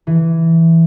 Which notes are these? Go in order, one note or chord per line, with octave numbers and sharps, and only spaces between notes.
E3